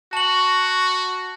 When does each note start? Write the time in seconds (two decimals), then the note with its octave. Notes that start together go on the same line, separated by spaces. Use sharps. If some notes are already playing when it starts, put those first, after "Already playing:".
0.13 F#4 A5 C#6 F#7